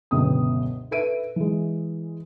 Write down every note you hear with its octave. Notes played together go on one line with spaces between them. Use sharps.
G1 C#2 B2 F#3 G5 D#6
A4 B4 E5 D7 D#7
E3 G#3